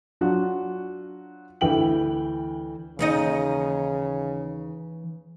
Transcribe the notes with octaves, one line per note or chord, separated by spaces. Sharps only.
F#3 D4 F4 F#4
D2 E3 G5 F#7
D#2 C#3 E3 D#4 D#5